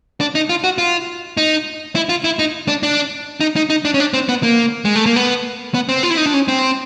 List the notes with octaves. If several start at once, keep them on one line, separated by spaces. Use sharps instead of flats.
D4
D#4
F4
F#4
F4
D#4
E4
F4
E4
D#4
D4
D4
D#4
D#4
D#4
D4
C#4
D4
C4
B3
A#3
G#3
A3
A#3
B3
B3
C4
F4
E4
D#4
D4
C#4
C4